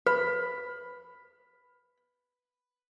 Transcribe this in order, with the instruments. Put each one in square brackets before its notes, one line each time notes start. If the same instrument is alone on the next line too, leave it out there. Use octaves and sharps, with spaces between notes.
[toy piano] B4 [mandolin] B5